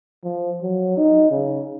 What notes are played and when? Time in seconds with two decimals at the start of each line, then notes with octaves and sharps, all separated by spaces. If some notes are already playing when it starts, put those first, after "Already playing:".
0.24 F3
0.62 F#3
0.97 D#4
1.31 C#3